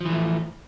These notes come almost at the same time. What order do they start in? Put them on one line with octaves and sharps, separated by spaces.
F3 E3 A3